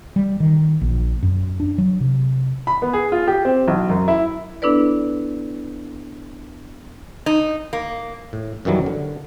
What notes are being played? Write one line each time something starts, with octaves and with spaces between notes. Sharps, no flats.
G3
D#3
A#1
F#2
D4
F#3
C3
B5
B3
G#4
F4
G4
C4
B1
F#2
E4
B3 D4 E4 A4 B4 D5
D#4
A#3
A2
F#2 D#3 E3 F#3 G3
D3